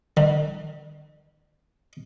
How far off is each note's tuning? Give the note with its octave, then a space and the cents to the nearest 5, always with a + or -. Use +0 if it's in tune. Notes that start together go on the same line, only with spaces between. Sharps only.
D3 +40